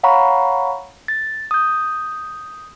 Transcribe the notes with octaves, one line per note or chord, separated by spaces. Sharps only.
C#5 F5 F#5 A#5 B5 C#6
A6
D#6 G6